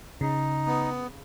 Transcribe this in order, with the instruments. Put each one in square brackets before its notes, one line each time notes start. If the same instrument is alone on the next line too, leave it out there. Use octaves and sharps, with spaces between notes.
[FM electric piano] C#3 [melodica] D#4
[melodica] B3